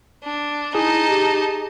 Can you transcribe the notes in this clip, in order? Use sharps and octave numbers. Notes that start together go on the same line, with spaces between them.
D4
D#4 E4 G#4 A5
G4